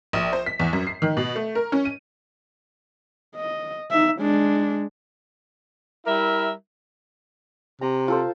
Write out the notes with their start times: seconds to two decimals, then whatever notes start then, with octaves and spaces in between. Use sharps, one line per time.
0.13 A#1
0.33 C5
0.46 B6
0.60 E2
0.73 F#2
0.87 C7
1.02 D#3
1.17 B2
1.36 A3
1.55 A#4
1.72 C#4
1.85 D#7
3.36 D#5
3.91 D#4 E5
4.20 G#3 D4
6.07 G3 E4 A#4 E5
7.81 C3 A#5
8.08 F4 A4 C5